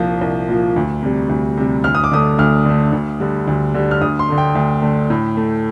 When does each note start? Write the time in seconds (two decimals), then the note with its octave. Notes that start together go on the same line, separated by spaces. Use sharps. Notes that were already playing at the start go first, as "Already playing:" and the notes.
Already playing: C2 A#2 F3
0.21 C2
0.49 A#2 F3
0.76 D2
1.03 C3 G3
1.29 D2
1.57 C3 G3
1.84 D2 F6
1.95 D#6
2.04 D6
2.11 D3 A3 D#6
2.38 D2 F6
2.65 D3 A3
2.93 D2
3.20 D3 G3
3.47 D2
3.74 D3 G3
3.91 F6
4.01 D2 D#6
4.19 C6
4.29 D3 A3
4.38 G5
4.55 D2
4.82 D3 A3
5.10 A2
5.37 A3